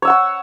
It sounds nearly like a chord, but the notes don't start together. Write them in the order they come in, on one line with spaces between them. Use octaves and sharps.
C#5 E6 F#5 C#6